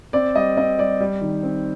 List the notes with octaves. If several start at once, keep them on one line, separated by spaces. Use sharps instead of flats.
C4 D5
G3 D#5
C4 D#5
G3 D5
G3
D#3
C4